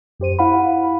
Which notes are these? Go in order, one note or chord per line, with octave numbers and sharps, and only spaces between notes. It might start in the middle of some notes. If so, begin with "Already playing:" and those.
F#2 G4 C5 D#7
E4 F5 F#5 B5